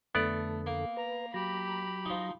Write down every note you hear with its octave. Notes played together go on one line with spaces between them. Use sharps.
F2 D3 A3 B3 A4 D5
A#3
B4 A#5
F#3 G4 A#5 B5
F3 D#4